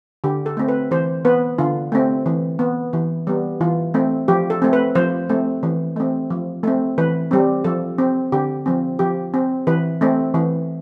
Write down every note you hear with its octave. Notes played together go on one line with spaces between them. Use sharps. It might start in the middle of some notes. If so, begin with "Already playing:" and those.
D3 G4
A4
A3 C4
B4
E3 C5
B3 B4
D3 F4
A3 C4
E3
B3
E3
G3 B3
E3 F4
A3 C4
F3 G4
A4
A3 C4
B4
F3 C5
A3 C4
E3
A3 C4
F3
A3 C4
E3 B4
G3 C4
F3 A4
C4
D3 G4
F3 C4
F3 G4
C4
E3 B4
A3 C4
E3